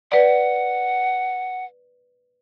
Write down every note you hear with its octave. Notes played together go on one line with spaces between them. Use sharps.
B4 D5 F#5